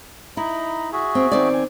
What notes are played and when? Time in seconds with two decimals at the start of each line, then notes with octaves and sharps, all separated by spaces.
0.37 D#4 E4 A#5 B5
0.92 F#4 G#4 E5
1.15 C4
1.31 D#3 C4 D5
1.54 G#5